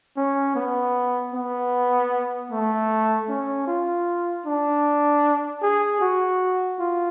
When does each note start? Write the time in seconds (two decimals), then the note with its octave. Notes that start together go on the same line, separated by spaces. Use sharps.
0.17 C#4
0.56 B3
1.34 B3
2.51 A3
3.29 C#4
3.67 F4
4.46 D4
5.62 G#4
6.01 F#4
6.80 F4